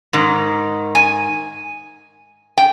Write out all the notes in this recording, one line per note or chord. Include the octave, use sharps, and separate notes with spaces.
G#2 D#3
G#5
G5